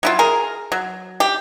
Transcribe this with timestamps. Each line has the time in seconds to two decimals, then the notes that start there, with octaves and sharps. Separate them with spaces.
0.03 F#3 E4 F4
0.19 G#4 A#4
0.72 F#3
1.20 G4